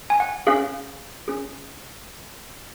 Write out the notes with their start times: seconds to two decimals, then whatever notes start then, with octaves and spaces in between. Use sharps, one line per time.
0.10 G#5
0.20 F#5
0.47 C#4 G#4 F5
1.28 C#4 G#4